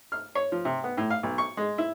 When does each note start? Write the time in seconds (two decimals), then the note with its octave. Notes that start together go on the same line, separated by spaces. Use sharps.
0.12 F6
0.35 C#5
0.52 F3
0.65 C3
0.84 B3
0.97 A2
1.10 F5
1.23 B1
1.38 C#6
1.57 G#3
1.78 E4